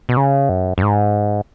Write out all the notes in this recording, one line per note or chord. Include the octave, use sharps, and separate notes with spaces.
B2
C#3
F#2
F#2
G#2